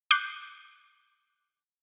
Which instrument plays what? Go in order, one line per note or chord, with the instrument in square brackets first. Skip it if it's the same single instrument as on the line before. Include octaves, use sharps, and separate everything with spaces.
[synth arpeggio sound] D6 F#6 G6 C7